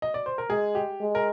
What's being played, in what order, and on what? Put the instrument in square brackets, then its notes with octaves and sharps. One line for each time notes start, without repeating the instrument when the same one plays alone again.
[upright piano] D#5
D5
C5
A#4
[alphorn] G#3 [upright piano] G#4
[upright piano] G4
[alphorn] G#3
[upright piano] A#4